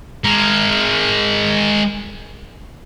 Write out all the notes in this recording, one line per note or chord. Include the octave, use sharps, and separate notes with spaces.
G#3 A#4